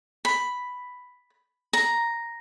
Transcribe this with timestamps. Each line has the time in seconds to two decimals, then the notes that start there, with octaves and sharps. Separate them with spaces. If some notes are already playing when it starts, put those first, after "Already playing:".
0.25 B5
1.73 A#5